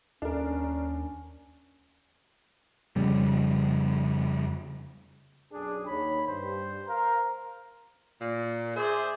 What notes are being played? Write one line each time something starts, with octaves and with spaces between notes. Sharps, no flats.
D#2 C#4 D4 A#4
F2 C#3 G3
B1 F#2 D4 G#4
D#2 C#5 B5
G2 C5
A#4 F5
A#2
G#4 C5 D5 E5